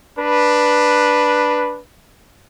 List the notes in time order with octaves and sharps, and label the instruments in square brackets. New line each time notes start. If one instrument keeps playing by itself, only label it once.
[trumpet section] D4 B4